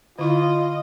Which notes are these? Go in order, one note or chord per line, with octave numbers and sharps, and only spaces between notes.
D3 E4 F4 D#5 F5